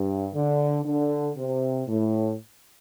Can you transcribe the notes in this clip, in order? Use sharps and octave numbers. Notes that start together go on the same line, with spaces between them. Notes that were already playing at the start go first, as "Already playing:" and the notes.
Already playing: G2
D3
D3
C3
A2